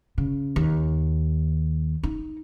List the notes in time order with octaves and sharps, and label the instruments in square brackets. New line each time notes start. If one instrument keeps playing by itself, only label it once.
[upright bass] C#3
D#2
D#4